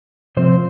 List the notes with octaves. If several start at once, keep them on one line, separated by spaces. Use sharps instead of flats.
C3 F3 C4 C5